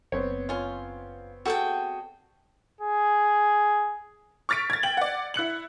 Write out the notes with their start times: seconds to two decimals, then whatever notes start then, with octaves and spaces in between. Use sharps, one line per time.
0.12 F#1 B3 C4 C#5
0.49 C#4 F4
1.45 G3 F#4 G#4 A4 G5
2.81 G#4
4.49 C#6 F6 A6 B6 D7
4.70 G#6 A6
4.83 G5 F#7
4.97 D5 F#5
5.34 E4 F#6 C#7 F#7